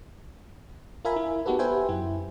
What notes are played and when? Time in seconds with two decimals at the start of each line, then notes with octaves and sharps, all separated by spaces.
1.05 F4 A#4 E5 G#5 B5
1.16 E4
1.46 B3 D#4 F#4 G4 A4 B4
1.59 G4 B4 C5 E5 G5 G#5
1.89 F#2 E4